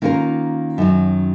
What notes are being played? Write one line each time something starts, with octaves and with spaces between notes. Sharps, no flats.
D#3 A#3 C#4 F4 A#4
F#2 D#3 F#3